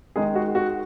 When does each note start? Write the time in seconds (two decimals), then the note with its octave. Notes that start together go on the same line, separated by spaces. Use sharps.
0.16 D#3 G#3 D#4 G#4
0.35 F#4
0.55 F#4